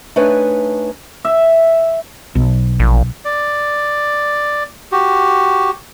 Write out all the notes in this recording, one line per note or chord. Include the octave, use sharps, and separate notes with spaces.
A3 D4 D#4 B4 C#5 G#5
E5
B1
A#1
D5
F#4 G4